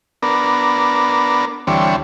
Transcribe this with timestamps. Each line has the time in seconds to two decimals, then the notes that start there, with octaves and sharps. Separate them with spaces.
0.23 B3 D4 A#4
1.67 D2 D3 E3 G3 C4 C#5